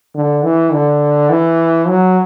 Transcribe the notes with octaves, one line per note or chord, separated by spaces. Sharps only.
D3
E3
D3
E3
F#3